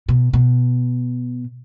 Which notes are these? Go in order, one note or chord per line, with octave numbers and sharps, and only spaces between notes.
B2
B2